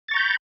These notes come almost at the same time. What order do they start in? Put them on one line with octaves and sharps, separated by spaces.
A6 C#6 A#5 G6 B5